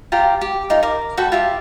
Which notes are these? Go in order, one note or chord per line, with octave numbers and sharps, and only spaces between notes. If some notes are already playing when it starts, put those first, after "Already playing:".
F4 G4 G5 A#5
G4
D#4 F4
A#4 D6
F#4 A4 G5 B5
F4 G4 E5